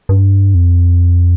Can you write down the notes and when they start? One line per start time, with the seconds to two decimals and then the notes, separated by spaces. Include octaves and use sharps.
0.09 G2
0.54 F2